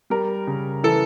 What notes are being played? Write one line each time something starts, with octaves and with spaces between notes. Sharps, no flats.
G3 A#4
C#3
E3 A4